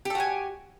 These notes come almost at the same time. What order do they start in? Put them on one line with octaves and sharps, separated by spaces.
G4 A4 F#4 G#5